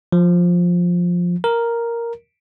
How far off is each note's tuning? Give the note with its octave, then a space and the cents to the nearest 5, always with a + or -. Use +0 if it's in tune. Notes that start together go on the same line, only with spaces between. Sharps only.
F3 +10
A#4 +0